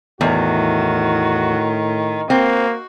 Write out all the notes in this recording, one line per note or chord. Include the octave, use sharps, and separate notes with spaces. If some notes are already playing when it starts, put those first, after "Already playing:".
E2 A2 D#3 F#4
A#3 C4 F#4